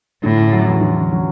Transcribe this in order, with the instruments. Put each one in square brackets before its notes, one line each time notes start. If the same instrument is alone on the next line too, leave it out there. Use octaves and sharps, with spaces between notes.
[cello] A2 [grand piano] D3
[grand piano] C#4
F#3
E2
D3
C#4
F#3